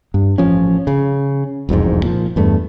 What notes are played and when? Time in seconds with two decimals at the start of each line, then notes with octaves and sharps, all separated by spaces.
0.14 G2
0.38 A1 F3 C#4
0.87 C#3
1.69 E1 C2 F2 G#2
2.03 A#2 F3
2.36 E2 G2 A3